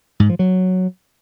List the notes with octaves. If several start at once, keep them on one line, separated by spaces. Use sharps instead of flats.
G#2
F3
F#3